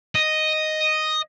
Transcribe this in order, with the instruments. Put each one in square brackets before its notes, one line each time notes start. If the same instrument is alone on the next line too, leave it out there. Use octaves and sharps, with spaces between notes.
[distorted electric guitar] D#5